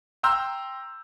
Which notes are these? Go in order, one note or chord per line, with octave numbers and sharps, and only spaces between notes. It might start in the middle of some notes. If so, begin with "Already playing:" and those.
G5 A#5 C6 E6 G6